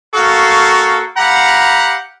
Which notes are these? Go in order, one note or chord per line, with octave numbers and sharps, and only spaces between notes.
A#3 F#4 A4 F5 C#6
G4 F5 F#5 A#5 B5